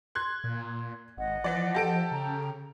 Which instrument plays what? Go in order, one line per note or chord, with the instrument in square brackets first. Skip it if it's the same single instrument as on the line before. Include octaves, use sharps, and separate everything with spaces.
[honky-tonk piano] C6 F#6 G#6
[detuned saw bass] A#2
[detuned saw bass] G#1 [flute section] D#5 F#5
[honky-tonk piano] E3 D5 [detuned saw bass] F3
[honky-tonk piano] G4 A4 D7
[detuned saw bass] C#3 [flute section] G5 A#5